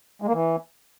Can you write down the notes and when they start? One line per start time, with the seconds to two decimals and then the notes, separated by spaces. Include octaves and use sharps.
0.22 G#3
0.27 A#3
0.33 E3